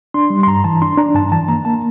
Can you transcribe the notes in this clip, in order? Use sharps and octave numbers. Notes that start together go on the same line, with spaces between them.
D4 C6
G3
C6
G2 A#5
E3 A5
D4 C6
D4 A#5
G2 A5
E3 A5
A#3 A#5
A#3 A5